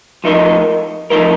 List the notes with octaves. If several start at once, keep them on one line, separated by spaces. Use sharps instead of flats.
F3 A3 D#4 A#4 D#5
F3 A3 D#4 A#4 D#5